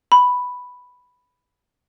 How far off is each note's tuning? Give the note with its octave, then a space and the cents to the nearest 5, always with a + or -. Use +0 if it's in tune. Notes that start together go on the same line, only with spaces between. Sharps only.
B5 +0